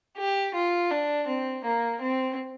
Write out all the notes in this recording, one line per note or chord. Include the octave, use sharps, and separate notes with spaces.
G4
F4
D4
C4
A#3
C4